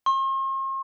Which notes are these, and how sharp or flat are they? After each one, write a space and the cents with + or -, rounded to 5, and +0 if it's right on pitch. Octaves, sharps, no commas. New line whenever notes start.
C6 +45